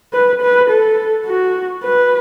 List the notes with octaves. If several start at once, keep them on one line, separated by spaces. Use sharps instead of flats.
B4
B4
A4
F#4
B4